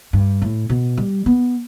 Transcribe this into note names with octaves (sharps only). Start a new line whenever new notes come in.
G2
A2
B2
G3
B3